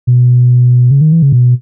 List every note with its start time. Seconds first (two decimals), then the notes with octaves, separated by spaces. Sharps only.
0.07 B2
0.91 C#3
1.01 D#3
1.12 E3
1.22 C#3
1.32 B2